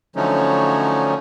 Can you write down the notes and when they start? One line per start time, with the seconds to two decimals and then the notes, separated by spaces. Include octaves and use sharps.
0.16 D3 F3 F#3 A3 C#4 D#4